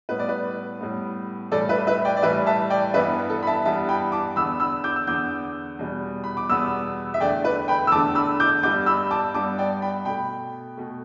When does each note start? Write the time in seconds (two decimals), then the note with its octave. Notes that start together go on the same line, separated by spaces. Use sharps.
0.09 A2 G3 B3 B4
0.19 D5
0.29 B4
0.81 A2 G3 B3
1.51 A2 E3 G3 A4 D5
1.69 B4 E5
1.87 B4 E5
2.05 D5 G5
2.17 D5
2.22 A2 E3 G3 B4 E5
2.47 E5 A5
2.70 D5 G5
2.94 G2 E3 G3 B3 B4 E5
3.30 A4
3.42 B5
3.47 E5 A5
3.65 G2 E3 G3 B3 E5 A5
3.89 G5 B5
4.12 A5 D6
4.36 E2 D3 B3 B5 E6
4.60 B5 E6
4.84 D6 G6
4.96 E6
5.07 E2 D3 B3 D6 G6
5.79 E2 B2 G3 B3
6.24 B5
6.37 D6
6.49 E2 B2 G3 B3 B5 E6
7.14 E5
7.20 E2 D3 A3 D5 G5
7.45 B4
7.68 G5 B5
7.87 E6
7.92 E2 D3 A3 A5 D6
8.15 B5 E6
8.40 D6 G6
8.63 G2 G3 B3 D6 G6
8.86 B5 E6
9.11 A5 D6
9.34 G2 G3 B3 A5 D6
9.58 D5 G5
9.82 G5 B5
10.05 B2 A3 G5 B5
10.77 B2 A3